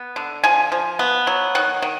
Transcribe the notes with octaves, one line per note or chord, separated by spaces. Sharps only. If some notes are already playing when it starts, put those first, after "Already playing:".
Already playing: B3
D3
F3 G#5
F3
B3
F#3
D#3 F#5
D#3